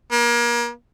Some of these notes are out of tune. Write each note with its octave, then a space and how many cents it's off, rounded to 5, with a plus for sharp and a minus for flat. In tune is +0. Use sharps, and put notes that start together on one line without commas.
A#3 +35